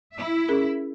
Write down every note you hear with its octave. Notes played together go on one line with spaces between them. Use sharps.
E4 E5
C#4 G#4 A#4